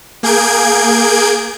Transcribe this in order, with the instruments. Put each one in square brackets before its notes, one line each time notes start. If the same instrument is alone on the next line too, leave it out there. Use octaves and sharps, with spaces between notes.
[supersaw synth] A#3 G#4 G6 G#6 D7